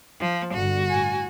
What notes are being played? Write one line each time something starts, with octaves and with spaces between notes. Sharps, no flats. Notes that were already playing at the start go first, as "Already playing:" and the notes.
F3
G1 G2 D3 F#4
A2 G#5